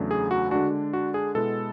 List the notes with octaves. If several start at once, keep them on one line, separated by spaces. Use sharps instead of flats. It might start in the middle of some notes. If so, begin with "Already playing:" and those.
Already playing: E2 C#3 F#3 A3 D4
G#4
F#4
D3 G#3 D4 F#4
F#4
G#4
B2 G#3 B3 E4 A4